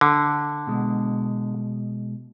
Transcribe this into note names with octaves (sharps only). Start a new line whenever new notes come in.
D3
B2 G#3